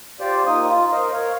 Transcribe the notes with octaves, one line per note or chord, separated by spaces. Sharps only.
F4 G4 C5 D5
A#3 D#4 F4 D#6
F4
A#4 C5 D#5
A#4 C#5 F5